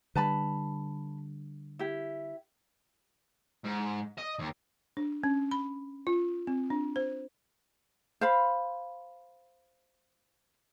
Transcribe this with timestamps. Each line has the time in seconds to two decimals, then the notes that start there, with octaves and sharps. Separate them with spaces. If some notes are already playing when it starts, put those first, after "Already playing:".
0.15 D3 G3 B4 A5 B5
1.79 E4 G4
3.65 G#2
4.18 D#5
4.39 D#2
4.97 D4
5.24 C#4
5.51 B5
6.07 F4
6.47 C4
6.70 D4
6.96 C5
8.21 C5 F5 B5